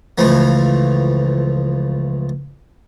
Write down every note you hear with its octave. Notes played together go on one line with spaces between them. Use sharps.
C#2 E3 F3 A3